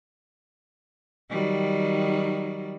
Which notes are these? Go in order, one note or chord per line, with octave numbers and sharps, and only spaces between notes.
D#3 F#3 G3